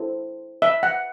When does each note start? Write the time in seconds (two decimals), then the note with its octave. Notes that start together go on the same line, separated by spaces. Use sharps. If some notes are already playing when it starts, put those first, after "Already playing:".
Already playing: E4 A4 C5
0.62 E5
0.83 F#5